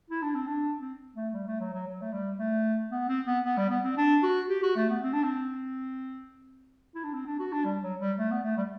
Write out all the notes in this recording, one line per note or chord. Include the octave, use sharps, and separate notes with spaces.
E4
D4
C4
D4
C4
A3
G3
A3
F#3
F#3
F#3
A3
G3
A3
B3
C4
B3
B3
G3
B3
C4
D4
F#4
G4
F#4
A3
B3
C4
D4
C4
E4
D4
C4
D4
F#4
D4
G3
F#3
G3
A3
B3
A3
G3